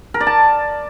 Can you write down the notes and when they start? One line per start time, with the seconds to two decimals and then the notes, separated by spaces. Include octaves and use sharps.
0.14 A#4
0.20 D5
0.27 A5